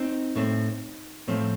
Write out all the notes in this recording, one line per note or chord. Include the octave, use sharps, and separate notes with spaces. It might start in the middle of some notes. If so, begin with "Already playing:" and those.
Already playing: C4 D#4
A2 A3 C4
A2 F3 A3 C4